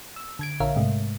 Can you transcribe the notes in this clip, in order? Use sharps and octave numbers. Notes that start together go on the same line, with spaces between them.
E6
D3 G#6 D7
A#1 D3 A#4 C#5 E5 F5
G#2 C3 G#3 A3